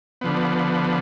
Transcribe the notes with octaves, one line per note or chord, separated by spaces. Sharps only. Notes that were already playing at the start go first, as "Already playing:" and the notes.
D3 F3 B3